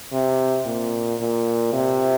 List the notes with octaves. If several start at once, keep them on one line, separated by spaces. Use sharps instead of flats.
C3
A#2
A#2
C3